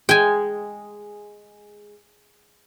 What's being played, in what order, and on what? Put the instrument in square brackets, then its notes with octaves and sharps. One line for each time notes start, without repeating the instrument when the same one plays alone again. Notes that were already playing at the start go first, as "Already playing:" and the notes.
[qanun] G#3 [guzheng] G5 G#5